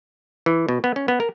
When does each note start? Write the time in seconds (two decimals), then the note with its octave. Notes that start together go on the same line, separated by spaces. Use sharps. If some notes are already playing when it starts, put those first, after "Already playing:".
0.46 E3
0.69 B2
0.84 B3
0.96 C#4
1.08 B3
1.20 A#4